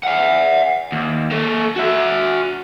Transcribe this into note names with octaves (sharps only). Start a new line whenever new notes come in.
E5 F#5
D#2
A#3 A4
F#4 E5